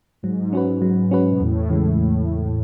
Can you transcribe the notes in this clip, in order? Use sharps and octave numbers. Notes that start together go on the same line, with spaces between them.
G#2 F#3
C#4 F#4 B4
F#3
C#4 F#4 B4
B2
E2 A2
C#3 E3 G#3
E2